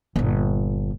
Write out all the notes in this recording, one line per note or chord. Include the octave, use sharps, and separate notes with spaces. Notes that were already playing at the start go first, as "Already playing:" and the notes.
G1 A#2